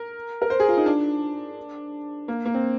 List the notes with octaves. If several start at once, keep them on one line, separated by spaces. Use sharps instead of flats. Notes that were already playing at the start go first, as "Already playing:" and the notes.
Already playing: A#4
A#4
C5
G#4
F4
D#4
D4
A#3
A#3
C4